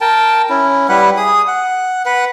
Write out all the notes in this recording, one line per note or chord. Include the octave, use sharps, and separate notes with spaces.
A#4 G5 A5
C#4 E4
G3 E4 B4 F#5
G#4 D#6
F#5
B4 F#5